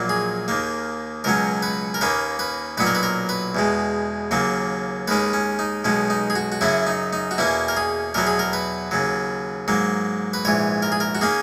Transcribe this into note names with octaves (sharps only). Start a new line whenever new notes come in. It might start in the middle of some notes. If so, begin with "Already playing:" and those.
Already playing: A#1 A#2 F#3 A#3
G#4
D#2 D#3 A#3
C#2 B2 F#3 C#4 A#4
B4
A#4
D#2 D#3 A#3 C#4 B4
B4
B1 A#2 F#3 B3 B4
A#4
B4
A#4
B4
E2 B2 G#3
D#2 C#3 F#3 A#3
D#2 D#3 G#3 C#4 B4
C#4
D#4
B1 B2 G#3 C#4
D#4
G#4
F#4
F#4
F#2 C#3 F#3 C#4 E4
D#4
D#4
F#4
E2 B2 A#3 C#4 E4
A#4
G#4
E2 B2 F#3 B3 A#4
G#4
A#4
B4
D#2 C#3 F#3
G#2 F#3 A#3
B4
A#1 G#2 E3 C#5
A#4
G#4
A#4
F#4
D#3 A#3 C#4 G#4